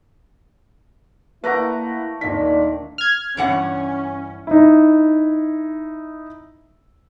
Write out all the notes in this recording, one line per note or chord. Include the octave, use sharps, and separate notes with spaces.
A3 A#3 E4 B4 F#5 A#5 D6
D#1 A#2 D#3 D4 B6
F6 G#6
G2 E3 C#4 F#5
D#4 E4